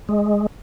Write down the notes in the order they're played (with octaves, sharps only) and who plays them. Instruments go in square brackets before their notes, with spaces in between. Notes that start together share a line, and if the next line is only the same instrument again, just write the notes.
[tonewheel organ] G#3